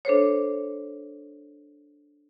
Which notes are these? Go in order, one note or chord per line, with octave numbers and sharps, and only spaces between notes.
D4 A4 C5 C#5